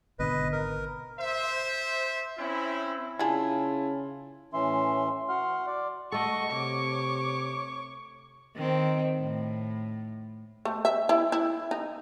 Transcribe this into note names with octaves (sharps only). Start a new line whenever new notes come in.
G#1 B2 D3 B4 D#5
A#4
C5 E5
C4 C#4 E4
C#3 D4 E4 F4 G#4 G#5 A5
A2 E3 C#4 E5 C6
F#4 F#5 C6 F6
D5
A3 F#4 A4 D#5 C#6
C3 C#5 D6
D#3 C4
A2
A3
E5
E4
E4
D#4